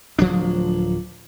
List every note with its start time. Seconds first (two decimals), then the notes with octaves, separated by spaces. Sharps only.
0.19 D1 F3 F#3 D4